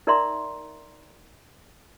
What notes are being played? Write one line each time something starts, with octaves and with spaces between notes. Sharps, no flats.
D#4 A#4 D5 E5 A#5 C6